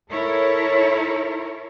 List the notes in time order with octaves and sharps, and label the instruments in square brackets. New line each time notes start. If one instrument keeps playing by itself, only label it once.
[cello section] E4 A4 A#4 C#5